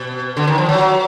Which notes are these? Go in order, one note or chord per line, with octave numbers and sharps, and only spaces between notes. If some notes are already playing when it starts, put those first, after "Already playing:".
Already playing: B2
D3
D#3
F3
F#3